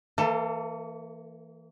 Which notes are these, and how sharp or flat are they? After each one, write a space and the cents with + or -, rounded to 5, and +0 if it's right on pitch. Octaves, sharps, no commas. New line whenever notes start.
E3 +0 A#3 -30 A4 +20